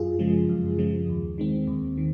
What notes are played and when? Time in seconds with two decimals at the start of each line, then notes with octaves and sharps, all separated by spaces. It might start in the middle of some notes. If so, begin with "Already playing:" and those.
Already playing: F#2 F4 G#4
0.19 C#3 F3 G#3
0.49 F#2
0.79 C#3 F3 G#3
1.09 D#2
1.38 D#3 G#3 C4
1.67 D#2
1.98 D#3